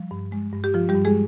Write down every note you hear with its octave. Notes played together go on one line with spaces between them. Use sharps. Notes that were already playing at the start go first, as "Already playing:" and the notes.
Already playing: F3 G3
G2
G#3
G2
G4
F3 F4
G3 G4
G2
G#3 G#4